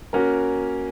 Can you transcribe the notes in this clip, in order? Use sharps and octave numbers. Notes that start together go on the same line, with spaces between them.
A#3 C#4 F#4 A#4